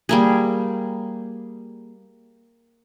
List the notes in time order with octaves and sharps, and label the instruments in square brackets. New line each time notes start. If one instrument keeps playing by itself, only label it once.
[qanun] G3 A#3 G#4